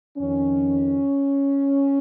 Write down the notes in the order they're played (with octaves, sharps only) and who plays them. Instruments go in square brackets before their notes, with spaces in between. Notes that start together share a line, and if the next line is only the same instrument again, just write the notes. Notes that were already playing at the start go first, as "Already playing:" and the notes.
[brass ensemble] F2 D#3 C#4